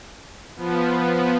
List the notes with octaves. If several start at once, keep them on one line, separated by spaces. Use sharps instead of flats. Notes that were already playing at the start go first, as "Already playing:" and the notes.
F3 B3